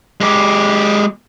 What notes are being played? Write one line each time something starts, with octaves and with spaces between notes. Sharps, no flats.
G#3 G4